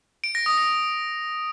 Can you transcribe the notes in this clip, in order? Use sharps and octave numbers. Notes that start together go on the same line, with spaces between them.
D7
A#6
D#6
A#6